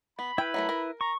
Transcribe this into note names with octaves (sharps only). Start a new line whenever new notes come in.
B3 B5
E4 B4 G5
F#3 A3 A#4
A#4
A#5 C#6